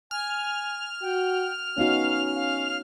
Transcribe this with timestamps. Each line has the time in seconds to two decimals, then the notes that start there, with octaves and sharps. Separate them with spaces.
0.11 G#5 F6
1.02 F#4 G5
1.78 B3 C#4 D#4 F#4 F5
2.35 F5